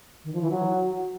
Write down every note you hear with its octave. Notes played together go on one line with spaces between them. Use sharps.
D#3
F3
E3
F#3